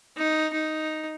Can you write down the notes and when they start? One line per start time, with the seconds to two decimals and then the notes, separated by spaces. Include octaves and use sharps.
0.17 D#4
0.53 D#4